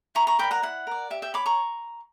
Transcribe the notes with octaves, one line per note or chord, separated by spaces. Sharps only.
E4 A#5 C#6
A#5 C#6
A#4 D5 G5 B5
F#5 A#5
E4 F#5
A#4 D5
G4 E5
E5 G5
C#5 B5 D6
A#5 C#6